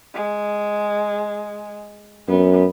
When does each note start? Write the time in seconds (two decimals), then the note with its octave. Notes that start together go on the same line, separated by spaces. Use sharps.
0.14 G#3
2.29 F#2 B3